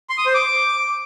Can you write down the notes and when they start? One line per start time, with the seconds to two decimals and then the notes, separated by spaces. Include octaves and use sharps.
0.10 C6
0.18 D#6
0.26 C5
0.34 D6